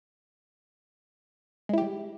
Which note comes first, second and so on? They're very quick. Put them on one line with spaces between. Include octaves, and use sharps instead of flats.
G#3 E4 G4 G3